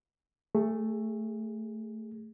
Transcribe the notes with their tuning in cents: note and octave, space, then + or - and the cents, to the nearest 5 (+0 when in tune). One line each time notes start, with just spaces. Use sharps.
A3 +5 G#4 -25